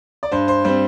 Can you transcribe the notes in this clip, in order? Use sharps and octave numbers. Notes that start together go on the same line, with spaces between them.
D5
G2 C5
C5
G3 C4 C5